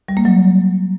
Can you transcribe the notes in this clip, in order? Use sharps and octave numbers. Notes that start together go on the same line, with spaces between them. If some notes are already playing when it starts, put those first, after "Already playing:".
G3
A#3
F#3